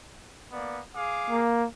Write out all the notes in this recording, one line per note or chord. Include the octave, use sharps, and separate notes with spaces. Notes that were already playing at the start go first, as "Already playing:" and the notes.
A#3 B3 D5
G#4 F5 D6
A#3